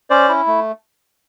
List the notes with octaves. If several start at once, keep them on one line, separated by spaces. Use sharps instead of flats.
C#4 C5 D5
E4
A3